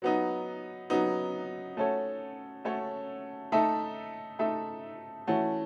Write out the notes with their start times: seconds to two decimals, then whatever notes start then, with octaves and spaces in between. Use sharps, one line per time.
0.02 F#3 B3 D#4
0.90 F#3 B3 D#4
1.77 A3 C#4 F#4 A4 C#5
2.65 A3 C#4 F#4 A4 C#5
3.52 A3 D#4 A4 E5
4.39 A3 D#4 A4 E5
5.27 E3 A3 C#4 F#4